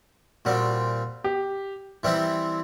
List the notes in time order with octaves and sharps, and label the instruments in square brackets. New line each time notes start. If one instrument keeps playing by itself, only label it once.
[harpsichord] A#2 G3 C4 [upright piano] F#4
[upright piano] G4
[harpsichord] E3 G3 C4 E4